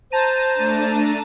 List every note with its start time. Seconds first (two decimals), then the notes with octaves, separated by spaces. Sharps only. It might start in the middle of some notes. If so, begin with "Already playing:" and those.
0.12 C5 A5 A#5 D#7
0.54 A3 D4